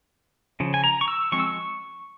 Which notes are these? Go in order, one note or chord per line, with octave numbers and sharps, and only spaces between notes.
C#3 F3
G#5
A#5
C#6
E6
F3 G#3 C4 C#6
E6
C#6